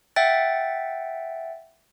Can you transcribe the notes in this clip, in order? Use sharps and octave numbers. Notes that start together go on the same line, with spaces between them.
E5 F#5 G5 A6